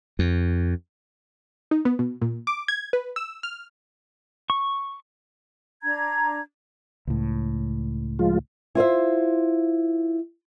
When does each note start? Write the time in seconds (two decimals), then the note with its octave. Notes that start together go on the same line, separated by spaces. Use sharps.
0.19 F2
1.71 D#4
1.85 B3
1.99 B2
2.22 A#2
2.47 D6
2.68 G#6
2.93 B4
3.16 E6
3.43 F6
4.50 C#6
5.82 D4 A#5 G#6
7.07 C#2 A2
8.19 F3 G#3 F4
8.75 E4 F4 C5 E5